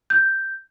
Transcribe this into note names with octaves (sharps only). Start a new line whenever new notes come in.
G6